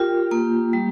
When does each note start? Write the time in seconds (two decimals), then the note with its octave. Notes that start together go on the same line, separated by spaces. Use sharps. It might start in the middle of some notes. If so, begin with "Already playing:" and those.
Already playing: F4 G4 A#4
0.31 A#3
0.73 G3